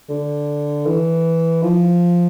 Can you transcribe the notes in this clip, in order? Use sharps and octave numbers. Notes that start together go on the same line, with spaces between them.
D3
E3
F3